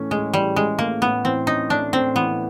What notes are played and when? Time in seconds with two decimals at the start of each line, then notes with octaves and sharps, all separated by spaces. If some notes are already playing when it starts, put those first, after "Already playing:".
Already playing: A2 E3 A3 C#4
0.11 A2 G#3
0.34 E3 G3
0.56 G#3 C#4
0.79 A3 A#3
1.02 A2 B3
1.25 E3 C4
1.47 C#4 D#4
1.70 A3 D4
1.93 A2 C4
2.15 E3 B3